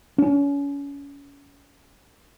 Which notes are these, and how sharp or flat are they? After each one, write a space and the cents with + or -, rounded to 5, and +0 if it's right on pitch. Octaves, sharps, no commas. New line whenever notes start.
C#4 +30